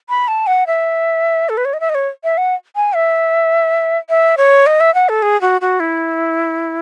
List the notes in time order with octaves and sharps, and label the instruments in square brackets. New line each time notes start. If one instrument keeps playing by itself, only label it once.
[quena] B5
A5
F#5
E5
A4
B4
C#5
D#5
E5
D#5
C#5
E5
F#5
G#5
E5
E5
C#5
D#5
E5
F#5
A4
G#4
F#4
F#4
E4